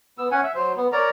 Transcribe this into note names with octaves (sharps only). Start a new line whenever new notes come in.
B3 E6
C#4 F#5 G#5
E5
F#3 C5
B3
A#4 C#5 D5 A#5